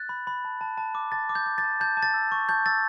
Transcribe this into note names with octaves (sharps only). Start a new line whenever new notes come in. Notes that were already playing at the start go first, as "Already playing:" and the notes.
Already playing: F#6 A6
B5
B5
A5
A5
A5
D6
A5 A6
D6
G6
D6
A6
A5
A5 G6
A5
A6
E6
C#6
A5 G6
E6 A6